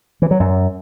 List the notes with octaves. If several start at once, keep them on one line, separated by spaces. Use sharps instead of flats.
E3
F#3
F#2